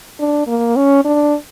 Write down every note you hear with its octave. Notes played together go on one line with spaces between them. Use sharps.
D4
A#3
C#4
D4